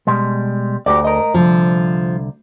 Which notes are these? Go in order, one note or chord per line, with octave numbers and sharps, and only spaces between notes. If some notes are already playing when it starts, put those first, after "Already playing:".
B2 G3 G#3
D2 F#4 G4 D5
A#4 D#5
C2 D3 F3